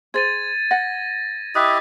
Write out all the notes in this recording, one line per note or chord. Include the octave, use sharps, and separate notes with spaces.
G#4 C5 G#6 A6 D#7
F#5 A#6
E4 G4 D#5 D#6 F#6 B6